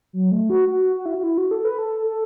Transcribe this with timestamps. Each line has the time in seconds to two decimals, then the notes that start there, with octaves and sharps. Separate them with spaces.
0.13 F#3
0.31 A3
0.50 F#4
0.69 F#4
0.96 F#4
1.06 E4
1.14 F#4
1.23 E4
1.38 F#4
1.51 A4
1.65 B4
1.78 A4
2.06 A4